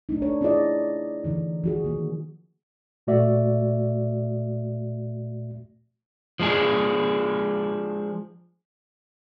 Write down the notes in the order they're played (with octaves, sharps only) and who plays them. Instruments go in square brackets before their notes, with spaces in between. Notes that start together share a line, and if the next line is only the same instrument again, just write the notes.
[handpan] A3 D4 D#4
D4 C#5
C#4 E4 F4 G#4 D5 D#5
D3 E3 D#4
F3 F#4 G#4
D#3 A#3
[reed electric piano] A#2 A3 F#4 D5 E5
[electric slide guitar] F3 G#3 D4 G#4